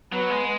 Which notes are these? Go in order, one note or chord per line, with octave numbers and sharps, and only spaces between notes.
F#3 B3
G#3